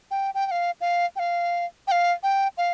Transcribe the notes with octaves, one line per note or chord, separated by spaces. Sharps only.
G5
G5
G5
F5
F5
G5
F5
G5
F5
G5
F5